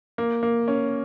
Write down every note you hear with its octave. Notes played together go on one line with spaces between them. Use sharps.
A#3
A#3
C#4